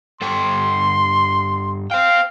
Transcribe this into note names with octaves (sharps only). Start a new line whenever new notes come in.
G2 A4 G5 C6
C5 F5 G5